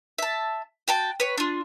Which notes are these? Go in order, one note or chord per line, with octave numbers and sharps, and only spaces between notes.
E5 A5
F#4 G5 A5
B4 C#5
D4 F4